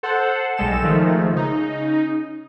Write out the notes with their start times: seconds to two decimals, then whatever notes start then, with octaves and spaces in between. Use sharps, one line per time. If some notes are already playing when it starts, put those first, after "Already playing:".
0.03 A4 C5 F#5
0.57 B1 G3 G#3 A4 E7
0.83 D#3 F3 G#3 A3
1.32 C#3 D#4